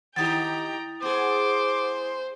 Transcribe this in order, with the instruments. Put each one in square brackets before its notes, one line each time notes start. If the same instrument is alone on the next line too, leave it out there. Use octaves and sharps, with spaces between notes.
[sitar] D#3 D#4 G4 [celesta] E4 D#6 A6 [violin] G5 A#5
[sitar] B3 G#4 [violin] C5 [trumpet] D6